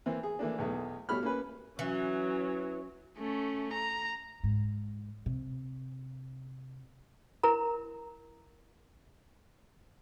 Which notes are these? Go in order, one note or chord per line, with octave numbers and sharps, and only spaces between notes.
E3 A#3 C4
G#4
E3 A3 A#3 D4
B1 E2 A3
B2 G3 A3 C#5 B5 F6
A#3 C#4 B4
E3 F#3 C#4
A3 C#4
A#5
G#2
C3
E4 A#4 A#5